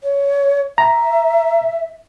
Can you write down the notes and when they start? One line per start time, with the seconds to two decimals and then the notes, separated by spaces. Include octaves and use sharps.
0.03 C#5
0.78 E5 A#5